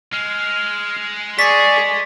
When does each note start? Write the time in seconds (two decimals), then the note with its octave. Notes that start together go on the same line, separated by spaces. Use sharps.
0.13 G#3 F6
1.39 G#4 D5 C#6 B6 C#7